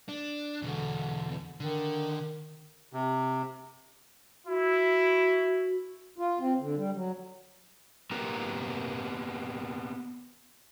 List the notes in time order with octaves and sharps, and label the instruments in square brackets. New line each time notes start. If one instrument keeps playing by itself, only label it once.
[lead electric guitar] D4
[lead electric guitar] E2 B2 [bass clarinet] D3
[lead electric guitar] D3 [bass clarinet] D#3
[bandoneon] C3
[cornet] E4 [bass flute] F#4
[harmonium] F4
C4
D3
G3
F#3
[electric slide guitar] A#3 B3 G4 A#4 A#5